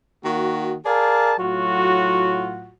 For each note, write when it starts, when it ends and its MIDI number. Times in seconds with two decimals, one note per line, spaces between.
0.23 0.76 51
0.23 0.76 58
0.23 0.76 66
0.84 1.33 68
0.84 1.33 70
0.84 1.33 74
0.84 1.33 77
0.84 1.33 81
1.39 2.71 45
1.39 2.71 54
1.39 2.71 65
1.39 2.71 66